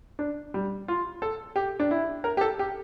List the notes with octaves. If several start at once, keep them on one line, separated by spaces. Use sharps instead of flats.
D4
G3
F4
A4
G4
D4
E4
A#4
G4
A4
G4